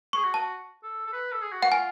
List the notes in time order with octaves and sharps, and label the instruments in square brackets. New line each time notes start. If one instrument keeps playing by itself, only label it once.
[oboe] G#4 [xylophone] C#6
[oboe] F#4
[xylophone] A5
[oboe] A4
A4
B4
A4
G#4
F#4
[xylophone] F#5
[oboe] F4 [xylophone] G#5